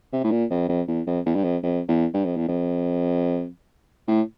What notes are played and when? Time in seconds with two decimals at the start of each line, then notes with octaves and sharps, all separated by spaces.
0.13 C3
0.24 A2
0.32 A#2
0.50 F2
0.69 F2
0.88 E2
1.07 F2
1.26 E2
1.36 G2
1.44 F2
1.63 F2
1.88 E2
2.14 G2
2.25 F2
2.36 E2
2.48 F2
4.08 A2